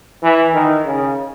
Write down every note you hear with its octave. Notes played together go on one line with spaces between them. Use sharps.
E3
D#3
C#3